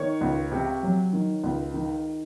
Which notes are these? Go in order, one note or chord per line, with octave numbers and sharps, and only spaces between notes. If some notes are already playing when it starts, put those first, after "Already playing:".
Already playing: D#3 C#5
C#2
C3
F#3
D#3
C#2
D#3